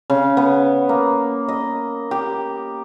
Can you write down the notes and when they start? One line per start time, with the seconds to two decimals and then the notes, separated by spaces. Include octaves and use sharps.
0.10 C#3
0.37 B3
0.89 A#3
1.48 D#5
2.11 G4